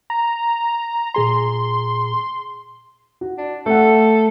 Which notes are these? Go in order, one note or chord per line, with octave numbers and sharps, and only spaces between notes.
A#5
A#2 G#4 A#5 C6
F#4
D4
A3 A4 F#5